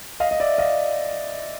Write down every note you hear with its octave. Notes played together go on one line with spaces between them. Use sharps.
D#5 F5
D#5
D5 E5
D#5 F5